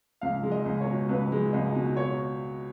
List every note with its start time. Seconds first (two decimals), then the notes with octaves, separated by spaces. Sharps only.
0.21 C#2 F5
0.43 G#3
0.51 D#5
0.65 C#2
0.81 C#5
0.87 B2
1.09 C#2 B4
1.32 G#3
1.53 C#2 D#5
1.75 B2
1.97 C#5